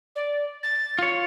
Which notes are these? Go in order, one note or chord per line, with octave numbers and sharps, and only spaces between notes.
D5
A6
F4 C#5